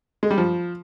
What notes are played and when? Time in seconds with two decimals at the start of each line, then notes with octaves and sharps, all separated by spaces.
0.23 G#3
0.31 G3
0.38 F3